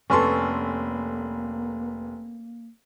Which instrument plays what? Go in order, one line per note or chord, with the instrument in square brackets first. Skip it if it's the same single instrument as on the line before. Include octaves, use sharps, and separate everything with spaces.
[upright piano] F1 B4 C6 [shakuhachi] A#3 [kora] C#4 A4